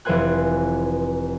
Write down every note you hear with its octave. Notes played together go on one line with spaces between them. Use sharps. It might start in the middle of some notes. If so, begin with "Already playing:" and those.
F1 E3 B4 C5 G#5 F#6